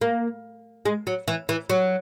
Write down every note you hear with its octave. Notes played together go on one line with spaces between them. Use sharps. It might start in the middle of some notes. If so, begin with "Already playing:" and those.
A#3
G#3
F#3
E3
E3
F#3